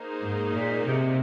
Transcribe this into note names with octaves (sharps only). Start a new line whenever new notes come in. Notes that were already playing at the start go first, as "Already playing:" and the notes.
Already playing: A#3 D#4 G#4 C5
G#2
A#2
C3